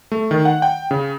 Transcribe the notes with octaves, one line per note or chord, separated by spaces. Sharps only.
A3
D#3
F#5
G5
C#3